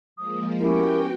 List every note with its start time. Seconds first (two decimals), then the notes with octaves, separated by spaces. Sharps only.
0.16 F3 G#3 A#3 D#6
0.60 B3 C#4 E4 F#4 G4 A#4 G5